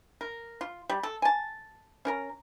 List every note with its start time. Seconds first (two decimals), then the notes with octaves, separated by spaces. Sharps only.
0.21 A#4
0.61 F4
0.90 G3
1.03 A4
1.22 G#5 A5
2.05 C#4 A#4 A#5